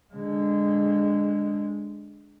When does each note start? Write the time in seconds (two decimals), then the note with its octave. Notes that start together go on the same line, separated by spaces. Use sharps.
0.14 D3 G#3